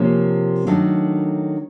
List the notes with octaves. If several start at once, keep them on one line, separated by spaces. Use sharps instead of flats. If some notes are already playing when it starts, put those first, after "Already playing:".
Already playing: C3 F3 A#3 C#4
D#3 F#3 A3 D4